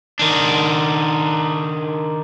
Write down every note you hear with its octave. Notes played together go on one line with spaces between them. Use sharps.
D#3 D4